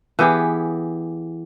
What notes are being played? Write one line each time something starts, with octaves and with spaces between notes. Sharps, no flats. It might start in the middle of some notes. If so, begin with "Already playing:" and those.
E3 B3 G4 G#4